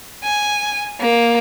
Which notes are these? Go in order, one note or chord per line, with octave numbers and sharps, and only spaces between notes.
G#5
A#3